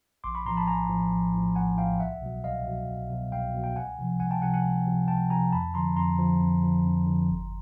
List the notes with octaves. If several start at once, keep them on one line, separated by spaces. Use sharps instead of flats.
A#1 C6 D6
B5 C#6
A2 F3 A#5 C6
A5 B5
A#1 G#5 A#5
A2 F3
A#1
A2 F3
A#1 F#5 G#5
A2 F3 F5 G5
C2 E5 F#5
B2 F#3
C2 D#5 F5
B2 F#3
C2
B2 F#3
C2 F5 G5
B2 F#3
G5
C#2 F#5 G#5
C3 F3
C#2 F#5 G#5
G5 A5
C3 F3 F#5 G#5
F#5 G#5
C#2
C3 F3
C#2 G5 A5
C3 F3 G#5 A#5
F2 A5 B5
D3 F3 A#5 C6
F2 A#5 C6
D3 F3
F2
D3 F3
F2
D3 F3
G1